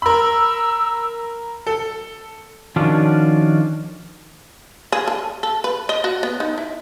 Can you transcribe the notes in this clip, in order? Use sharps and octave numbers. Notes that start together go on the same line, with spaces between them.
A#4 B5 E6
A4
D#3 F3 C#4 D4 F4 F#4
G#4
A4
A4
B4
D#5
F#4
B3
D#4
E4